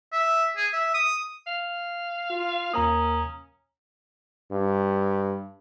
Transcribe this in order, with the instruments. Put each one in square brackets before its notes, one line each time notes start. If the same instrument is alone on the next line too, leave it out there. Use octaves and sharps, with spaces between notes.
[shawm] E5
G#4
E5
D#6
[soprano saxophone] F5
[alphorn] F4
[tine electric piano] D#2 A#5 D#6 [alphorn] A#3 [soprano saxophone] C#4
[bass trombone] G2